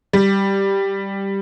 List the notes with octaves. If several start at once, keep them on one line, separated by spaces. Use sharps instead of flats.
G3